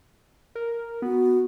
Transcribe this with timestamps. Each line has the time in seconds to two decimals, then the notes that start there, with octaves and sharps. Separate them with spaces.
0.55 A#4
1.02 B3 F#4